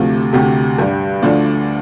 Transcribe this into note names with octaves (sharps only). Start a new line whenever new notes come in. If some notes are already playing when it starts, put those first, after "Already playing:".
Already playing: D2 C3 F3 A3
D2 C3 A3 G4
G2 G3
D2 D3 F3 A3 D4